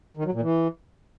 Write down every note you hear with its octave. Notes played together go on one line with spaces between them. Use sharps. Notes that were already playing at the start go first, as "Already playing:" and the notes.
D#3
F#3
A#2
E3